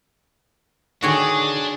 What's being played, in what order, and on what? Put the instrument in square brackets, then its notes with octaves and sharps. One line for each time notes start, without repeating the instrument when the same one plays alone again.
[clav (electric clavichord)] D3 D#3 [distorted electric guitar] D4 [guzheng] F#4 C#5 G5 [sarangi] G#4